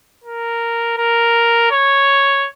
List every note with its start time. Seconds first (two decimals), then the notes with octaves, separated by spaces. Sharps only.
0.24 A#4
0.98 A#4
1.71 C#5